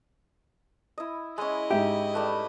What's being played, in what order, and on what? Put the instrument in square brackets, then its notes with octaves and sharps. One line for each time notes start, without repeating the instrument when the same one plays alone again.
[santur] E4 D#5
[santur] G#3 C#4 [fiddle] E4 D#5
[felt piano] G#2 E5 [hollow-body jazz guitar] G4 [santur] G5
[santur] G3 A3 B4